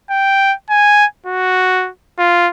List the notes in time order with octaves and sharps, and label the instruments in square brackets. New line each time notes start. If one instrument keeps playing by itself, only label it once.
[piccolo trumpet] G5
G#5
F#4
F4